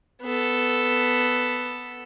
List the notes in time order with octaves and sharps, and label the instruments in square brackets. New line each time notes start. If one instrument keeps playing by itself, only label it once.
[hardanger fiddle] B3 A4